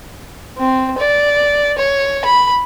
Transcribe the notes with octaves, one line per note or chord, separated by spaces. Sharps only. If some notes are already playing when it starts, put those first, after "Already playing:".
C4
D5
C#5
B5